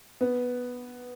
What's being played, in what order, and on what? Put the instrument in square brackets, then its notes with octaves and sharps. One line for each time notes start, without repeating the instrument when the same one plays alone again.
[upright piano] B3